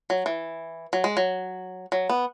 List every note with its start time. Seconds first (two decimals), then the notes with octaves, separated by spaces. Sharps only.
0.10 F#3
0.26 E3
0.93 F#3
1.04 G#3
1.17 F#3
1.92 F#3
2.09 B3